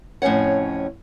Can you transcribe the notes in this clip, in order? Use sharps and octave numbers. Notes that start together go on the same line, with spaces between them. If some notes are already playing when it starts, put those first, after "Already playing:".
F2 A2 C#4 C#5 F#5